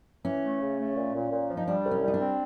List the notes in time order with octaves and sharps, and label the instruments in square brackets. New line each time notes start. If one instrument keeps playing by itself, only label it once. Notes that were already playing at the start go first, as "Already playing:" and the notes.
[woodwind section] E3 [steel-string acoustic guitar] C#4
[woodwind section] A3
C#3
A3
A#2
A#2
A#2
F3
[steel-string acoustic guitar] D#4
[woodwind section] G3 [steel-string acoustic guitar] D4
[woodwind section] C2
[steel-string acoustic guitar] C#4
[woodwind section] G3
[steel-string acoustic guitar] D#4
D4
[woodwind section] C4